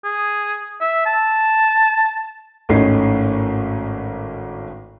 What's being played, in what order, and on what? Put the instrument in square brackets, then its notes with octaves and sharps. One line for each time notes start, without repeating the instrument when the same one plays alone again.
[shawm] G#4
E5
A5
[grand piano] G#1 A2 A3 C#4 D#4 C7